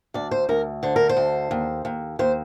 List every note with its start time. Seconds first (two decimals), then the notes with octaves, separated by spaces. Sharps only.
0.14 D2 D5
0.31 C5
0.49 D2 A#4
0.83 D3 C5
0.96 A#4
1.09 C5
1.17 D2
1.51 D#2
1.85 D#2
2.19 D#2 C5